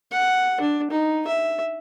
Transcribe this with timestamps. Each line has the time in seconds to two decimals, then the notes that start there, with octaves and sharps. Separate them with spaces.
0.11 F#5
0.60 D4
0.90 D#4
1.27 E5